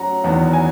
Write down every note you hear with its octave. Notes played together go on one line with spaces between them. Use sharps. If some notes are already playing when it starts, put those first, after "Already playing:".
Already playing: F#3 C#4 F#5 A#5
E2 D#3 F#3 B3
G#5